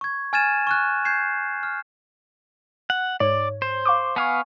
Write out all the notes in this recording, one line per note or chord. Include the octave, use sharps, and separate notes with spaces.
C#6 G#6
G#5 F6 G#6 A6 D#7 E7
C#6 F6 F#6
G6 G#6 C7 E7
F6
F#5
G#2 C#5 D5
C5
F5 C#6 D6
B3 F5 G#5 C#6